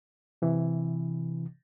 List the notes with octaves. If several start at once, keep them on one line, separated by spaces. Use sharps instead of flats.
C3 E3